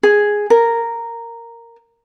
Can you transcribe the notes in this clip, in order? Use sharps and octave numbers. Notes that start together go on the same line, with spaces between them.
G#4
A#4